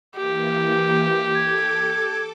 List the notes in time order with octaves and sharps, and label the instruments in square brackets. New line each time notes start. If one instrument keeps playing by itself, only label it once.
[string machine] E3 A#3 [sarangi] G4
[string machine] A4 D6 [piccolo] G#6